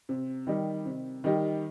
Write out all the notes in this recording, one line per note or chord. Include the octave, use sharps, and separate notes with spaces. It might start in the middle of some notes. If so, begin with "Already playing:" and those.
C3
D#3 G3 D#4 G4
C3
D#3 G3 D#4 G4